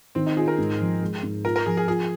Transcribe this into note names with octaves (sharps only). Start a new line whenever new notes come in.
D#3 C4
D#4
F4 G#4
A#4
G#2
F3
G#3
G#2
F4 A#4
A#4
F3 G#4
G#4
F4 G#4